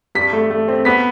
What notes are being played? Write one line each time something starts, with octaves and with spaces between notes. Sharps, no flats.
G2 B6
A3
A3
C4
B3 B6